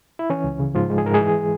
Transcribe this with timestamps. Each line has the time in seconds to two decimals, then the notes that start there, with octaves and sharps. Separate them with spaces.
0.19 E4
0.30 E3 C#4
0.44 C#2
0.60 C#3
0.75 G#2 F3 F4
0.90 G#3
0.98 G#4
1.05 G#2 A#4
1.14 G#3 G#4
1.21 E3